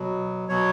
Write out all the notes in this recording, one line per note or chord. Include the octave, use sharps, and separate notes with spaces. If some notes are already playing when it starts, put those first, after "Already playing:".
Already playing: B2 F#3
B2 F#3 C#5